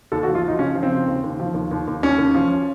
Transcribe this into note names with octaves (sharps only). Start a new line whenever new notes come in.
D#2 A4
F#4
F3
F4
F3
D#4
C#3 C#4
F3
C4
C#3
D#2
D#2
F3
D#2
D#2
D#2
D#2 C#4
D#2
F3